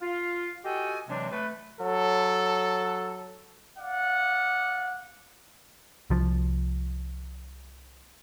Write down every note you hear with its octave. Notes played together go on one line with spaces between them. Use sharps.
F4 F5
F#4 G4 A4 D#5 G5 G#5
C3 E3 F#3 G#3 C4 D4
A3 B4
F#3 A4
D5 F5 F#5
C2 F3